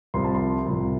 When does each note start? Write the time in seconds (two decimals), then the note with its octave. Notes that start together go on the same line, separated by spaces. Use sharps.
0.14 C2 C3 F3 C6
0.24 A5
0.35 C6
0.66 C2 C3 F3